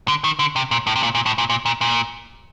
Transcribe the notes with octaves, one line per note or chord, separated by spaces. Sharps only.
D3
D#3
D3
C3
A#2
A2
C3
A#2
A#2
A2
A#2
A#2
A#2
A#2